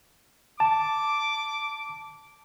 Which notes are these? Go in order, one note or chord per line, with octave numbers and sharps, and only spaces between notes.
A5 D6